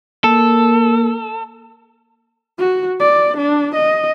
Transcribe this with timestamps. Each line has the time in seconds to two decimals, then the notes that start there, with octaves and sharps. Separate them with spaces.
0.24 A#3 A4
2.58 F#4
3.00 D5
3.37 D4
3.75 D#5